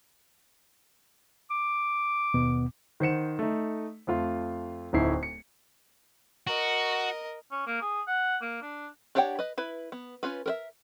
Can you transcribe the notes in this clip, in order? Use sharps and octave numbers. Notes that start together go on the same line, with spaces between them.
D6
D#2 B2 B3
D#3 C5 F#5 C#7 E7
A3 D#4
F2 A3 F4 C6
D1 D2 D#4 E4 C7
C#7
F#4 A#4 D#5
C#4
A#3
G#4
F#5
A#3
D4
D4 G4 C#5 F#5 G5
B4 D#5
E4 B4
B3
C#4 F4 B4
A#4 B4 E5